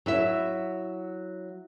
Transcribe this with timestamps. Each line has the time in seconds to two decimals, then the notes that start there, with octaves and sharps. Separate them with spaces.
0.06 F#3 E4 E5